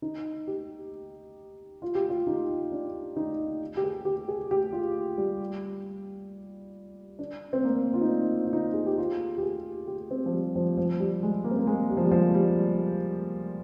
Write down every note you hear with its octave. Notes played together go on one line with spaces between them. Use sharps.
D#4
G4
F4
G4
F4
D#4
D4
D#4
G4
G#4
G4
G#4
G4
F4
G3
D4
C4
A#3
F4
D#4
D4
F4
D#4
G#4
G4
F4
G4
G#4
G4
C4
F3
G3
F3
F3
G3
G#3
A#3
C4
A#3
G#3
G3
F3
G3
F3
G3